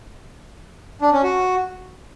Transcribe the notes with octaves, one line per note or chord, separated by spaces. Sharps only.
D4
C#4
F#4